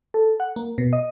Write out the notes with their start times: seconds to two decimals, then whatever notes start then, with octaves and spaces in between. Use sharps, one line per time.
0.14 A4
0.40 F#5
0.56 A#3
0.78 B2
0.93 D#5